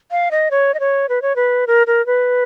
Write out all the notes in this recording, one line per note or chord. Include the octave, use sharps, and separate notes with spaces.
F5
D#5
C#5
D#5
C#5
B4
C#5
B4
A#4
A#4
B4